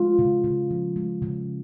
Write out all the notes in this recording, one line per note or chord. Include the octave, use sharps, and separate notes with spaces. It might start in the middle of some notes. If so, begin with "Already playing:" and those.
Already playing: G#3 F4
C#3
C#3
F3
G#3
C#3